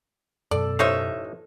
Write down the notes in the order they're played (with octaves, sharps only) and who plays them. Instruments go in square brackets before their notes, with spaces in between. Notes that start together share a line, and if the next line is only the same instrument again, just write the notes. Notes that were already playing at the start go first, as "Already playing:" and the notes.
[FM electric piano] F#2 B2 [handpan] A4 [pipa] D5
[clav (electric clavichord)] A1 D#4 F5 [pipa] C5 C#5 E5